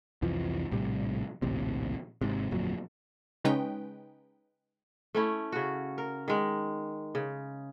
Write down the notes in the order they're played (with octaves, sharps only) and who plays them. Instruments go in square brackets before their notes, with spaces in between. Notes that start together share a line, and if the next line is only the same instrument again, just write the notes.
[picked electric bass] C2 F2 E3 F3
A#1 A2 C3 G3
A#1 D#2 A2 C3
G#1 G#2 C3
G1 F2 A#2 F#3
[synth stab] C#3 G#3 C#4 D#4 B4 G5
[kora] A3 C#4 E4
C#3 F#4
A#4
D#3 G#3
C#3